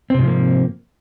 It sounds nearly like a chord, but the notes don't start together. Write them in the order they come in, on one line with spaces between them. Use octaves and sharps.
C4 C3 G#2 F3 A#3